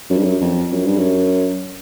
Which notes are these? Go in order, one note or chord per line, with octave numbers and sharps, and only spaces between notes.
F#2
G2
F#2
F2
F#2
G2
F#2